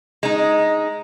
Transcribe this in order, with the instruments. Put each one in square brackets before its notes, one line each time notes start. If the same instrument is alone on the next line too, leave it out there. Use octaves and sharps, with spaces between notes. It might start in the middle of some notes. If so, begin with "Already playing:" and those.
[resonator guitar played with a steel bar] G#3 D#4